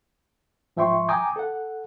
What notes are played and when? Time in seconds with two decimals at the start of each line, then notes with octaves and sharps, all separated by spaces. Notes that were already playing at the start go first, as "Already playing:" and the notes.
0.77 G#2 F3 E5 G5 C6 C#6
1.09 G5 G#5 A#5 D6 D#6 G6
1.36 A4 F#5